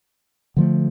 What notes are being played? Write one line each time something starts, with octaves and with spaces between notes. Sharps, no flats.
D3 F3 A3